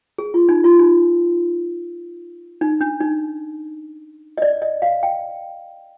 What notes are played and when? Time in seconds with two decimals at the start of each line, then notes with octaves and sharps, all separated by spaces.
0.18 G#4
0.34 F4
0.49 D#4
0.64 F4
0.79 D#4
2.61 D#4
2.81 D4
3.01 D#4
4.38 D#5
4.42 D5
4.62 D#5
4.82 F5
5.03 G5